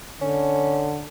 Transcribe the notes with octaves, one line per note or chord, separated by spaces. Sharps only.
D3 C#4